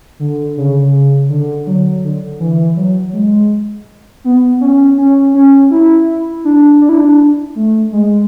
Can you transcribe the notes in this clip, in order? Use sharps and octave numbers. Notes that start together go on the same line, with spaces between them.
D3
C#3
D3
F#3
D3
E3
F#3
G#3
B3
C#4
C#4
C#4
E4
D4
D4
E4
D4
A3
G#3